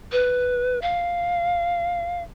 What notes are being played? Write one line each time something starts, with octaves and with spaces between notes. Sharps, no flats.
B4
F5